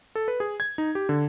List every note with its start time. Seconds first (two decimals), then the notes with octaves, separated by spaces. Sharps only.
0.15 A4
0.28 B4
0.40 G#4
0.60 G#6
0.78 D#4
0.95 G4
1.09 D3